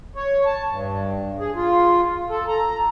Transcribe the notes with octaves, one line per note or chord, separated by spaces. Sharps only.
C#5
A5
G2
G#4
F4
A4
A#5